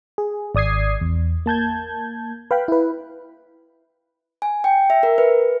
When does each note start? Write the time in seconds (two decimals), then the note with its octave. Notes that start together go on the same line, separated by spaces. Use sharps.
0.18 G#4
0.55 G#1 D5 D#6 G#6 C7
1.01 E2
1.46 A#3 A5 G6 G#6
2.51 B4 F5 G5 B5
2.68 E4 B4
4.42 G#5
4.64 G5
4.90 E5
5.03 A#4
5.18 B4